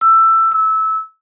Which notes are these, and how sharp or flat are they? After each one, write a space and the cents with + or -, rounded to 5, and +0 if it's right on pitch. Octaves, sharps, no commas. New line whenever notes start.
E6 +15
E6 -20